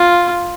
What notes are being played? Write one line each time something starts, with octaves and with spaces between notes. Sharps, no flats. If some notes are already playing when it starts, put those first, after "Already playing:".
Already playing: F4